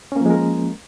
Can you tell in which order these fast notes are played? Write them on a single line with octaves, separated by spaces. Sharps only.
C#4 A#3 F3 G#3 A#4